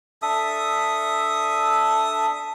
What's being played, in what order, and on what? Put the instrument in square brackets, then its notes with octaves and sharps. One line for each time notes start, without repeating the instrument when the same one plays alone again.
[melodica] D4 A4 E5 D#6